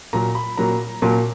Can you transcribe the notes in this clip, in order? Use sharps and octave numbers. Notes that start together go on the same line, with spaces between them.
A#2 F#3 A#3 A#5
B5
A#2 F#3 A#3 A#5
A#2 F#3 A#3 A5